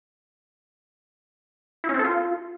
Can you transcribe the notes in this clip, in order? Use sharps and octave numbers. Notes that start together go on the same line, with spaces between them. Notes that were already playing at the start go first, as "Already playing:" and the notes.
E4
C#4
C4
A4
F4